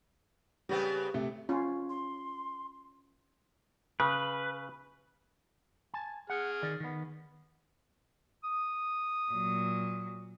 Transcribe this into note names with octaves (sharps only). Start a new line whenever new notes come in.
C#3 G3 B3 C4
C3 A3
C#4 F4
C6
C#3 B4
G#5 A5
G#4 F#5 F6
D#3 D5
D#3 B3
D#6
A#2 F#3